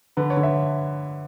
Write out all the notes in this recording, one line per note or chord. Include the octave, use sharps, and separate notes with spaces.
D3 B4
C#5
D3
E5